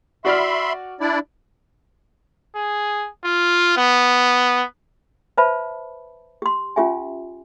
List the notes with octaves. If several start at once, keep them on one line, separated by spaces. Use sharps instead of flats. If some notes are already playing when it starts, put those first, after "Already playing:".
F#4 D5 E5 B5 C6 F6
D4 E4 D5
G#4
F4
B3
B4 C5 E5 A5 B5
G4 C6
C#4 F4 G4 E5 G#5